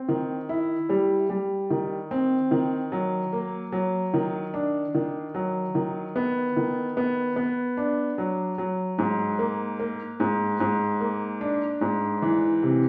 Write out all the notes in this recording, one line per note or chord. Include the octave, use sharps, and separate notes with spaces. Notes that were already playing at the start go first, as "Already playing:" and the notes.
Already playing: C4
D#3
E4
G3
G3
D#3
C4
D#3
F#3
A#3
F#3
D#3
D4
D#3
F#3
D#3
B3
D#3
B3
B3
D4
F#3
F#3
G#2
A#3
A#3
G#2
G#2
A#3
D4
G#2
E3
C3